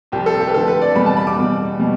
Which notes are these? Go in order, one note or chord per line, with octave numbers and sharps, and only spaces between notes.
C2 C3 F3 G4
A4
G4
B4
F2 D3 F3 A3 A4
B4
D5
E2 B2 G3 B5
A5
B5
D6
E2 B2 G3
B2 G3